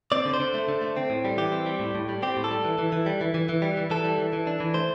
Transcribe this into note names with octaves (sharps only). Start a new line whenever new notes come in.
C4 D5
D3
C5
D3
A3
D3
A3
C4
A2
G3
E3 G4
C4
G3
A2
A2
G3
C4 G4
A2
A4
G3
E3
E3
E3
G3
E3
E3
E3
G3
E3
E3 A4
G3
E3
E3
D4
E3
A3 C5